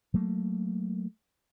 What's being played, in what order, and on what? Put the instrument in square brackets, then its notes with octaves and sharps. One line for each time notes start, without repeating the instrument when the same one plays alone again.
[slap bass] F#3 A3 A#3